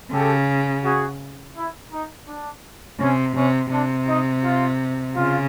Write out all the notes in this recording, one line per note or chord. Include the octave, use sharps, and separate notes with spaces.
C#3 G4 A4
F#4 G#4
E4
D#4
D4
C3 C#4
C3 C#4
C3 D4
D#4
F4
C#3 F4